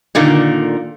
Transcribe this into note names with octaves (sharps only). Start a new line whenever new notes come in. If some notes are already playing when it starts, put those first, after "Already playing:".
A#2 D3 D#3 A#3